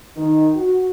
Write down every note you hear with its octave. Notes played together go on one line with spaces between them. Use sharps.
D#3
F#4